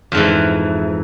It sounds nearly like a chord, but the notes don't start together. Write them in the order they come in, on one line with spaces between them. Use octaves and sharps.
F2 G#2 E3